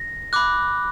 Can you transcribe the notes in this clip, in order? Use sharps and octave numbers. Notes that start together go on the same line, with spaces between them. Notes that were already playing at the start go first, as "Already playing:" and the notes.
Already playing: A#6
B5 D6 F#6